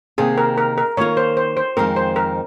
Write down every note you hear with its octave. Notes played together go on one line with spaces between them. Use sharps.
C3 D#3 A#3 G#4
A#4
A#4
A#4
D#3 A#3 F4 A#4 C#5
C5
C5
C5
F2 D#3 G#3 C4 A#4
C5
A#4